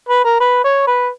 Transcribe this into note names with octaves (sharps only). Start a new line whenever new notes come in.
B4
A#4
B4
C#5
B4